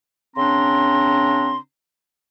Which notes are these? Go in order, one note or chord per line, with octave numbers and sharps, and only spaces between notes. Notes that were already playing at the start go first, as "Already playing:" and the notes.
C#3 C4 D4 A#5 C6